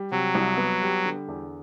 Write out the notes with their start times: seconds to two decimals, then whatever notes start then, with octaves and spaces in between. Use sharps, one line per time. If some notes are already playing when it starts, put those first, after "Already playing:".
Already playing: G3
0.11 C3 F#3
0.35 C2
0.58 B3
0.82 G3
1.05 D3
1.28 E2